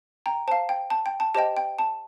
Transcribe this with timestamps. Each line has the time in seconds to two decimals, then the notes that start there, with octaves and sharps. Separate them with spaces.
0.26 G5 A#5
0.48 C5 A5
0.52 F5
0.69 G5
0.90 A5
1.06 G5
1.20 A5
1.34 G4 C5 D#5 G5 A5
1.57 G5
1.79 A5